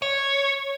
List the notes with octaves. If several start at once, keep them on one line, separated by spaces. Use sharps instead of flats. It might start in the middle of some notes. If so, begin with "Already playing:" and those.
C#5